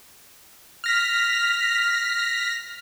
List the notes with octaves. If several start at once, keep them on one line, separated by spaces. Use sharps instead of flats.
F6 A#6 B6